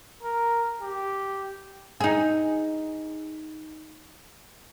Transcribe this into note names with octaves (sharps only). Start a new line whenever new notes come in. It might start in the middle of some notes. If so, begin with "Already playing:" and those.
A#4
G4
D#4 G#4